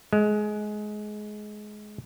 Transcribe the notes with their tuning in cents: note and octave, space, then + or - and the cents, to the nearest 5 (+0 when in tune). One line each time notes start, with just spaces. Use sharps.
G#3 +20